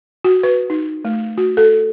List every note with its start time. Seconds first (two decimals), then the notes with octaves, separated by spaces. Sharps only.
0.24 F#4
0.43 B4
0.70 D#4
1.05 A3
1.38 F#4
1.57 A4